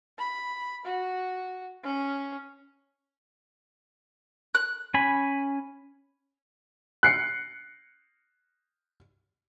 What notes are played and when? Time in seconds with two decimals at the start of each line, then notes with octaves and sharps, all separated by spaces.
0.18 B5
0.85 F#4
1.84 C#4
4.55 F#6
4.94 C#4 G#5 B5
7.03 F#6 C7 C#7